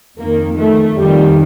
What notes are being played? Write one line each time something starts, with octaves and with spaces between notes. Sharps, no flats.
F2 D#3 A#3
A3
F2 D#3 G3